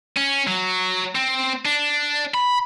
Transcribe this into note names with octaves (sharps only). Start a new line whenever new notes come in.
C#4
F#3
C4
D4
B5